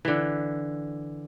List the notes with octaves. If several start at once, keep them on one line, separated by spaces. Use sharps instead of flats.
D3 E3